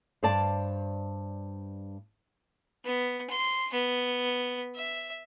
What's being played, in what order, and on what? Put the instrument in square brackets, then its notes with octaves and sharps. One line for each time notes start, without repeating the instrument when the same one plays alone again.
[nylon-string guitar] G2 C5 D5 A5
[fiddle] B3
C6
B3
E5